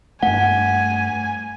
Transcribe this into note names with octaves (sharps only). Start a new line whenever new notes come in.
G2 A3 F#5 G#5